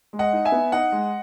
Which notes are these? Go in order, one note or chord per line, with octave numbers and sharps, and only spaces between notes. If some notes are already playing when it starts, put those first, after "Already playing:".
G#3
D#5 F#5
D#4
E5 G#5
B3
D#4 D#5 F#5
G#3